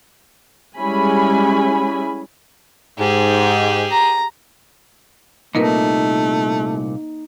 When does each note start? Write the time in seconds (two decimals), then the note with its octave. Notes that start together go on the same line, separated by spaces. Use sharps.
0.79 G3 G#3 C#4 E4 G#5 B5
2.99 G#2 G4 G#4
3.91 A#5
5.55 C2 A#2 A3 A#3 D#4 A#4 B4